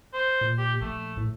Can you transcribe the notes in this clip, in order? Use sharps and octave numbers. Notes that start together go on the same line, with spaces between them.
C5
A#2
G4
A#1 A3
A2